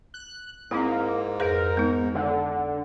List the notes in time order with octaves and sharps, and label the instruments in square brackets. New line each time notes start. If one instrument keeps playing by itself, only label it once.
[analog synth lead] F#6
[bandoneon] G#2 [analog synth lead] A#3 [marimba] C4 E4
[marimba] F2 G#4 B4 [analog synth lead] A#4
[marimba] G#3 D#4 [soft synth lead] B3
[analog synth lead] D3 [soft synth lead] F#5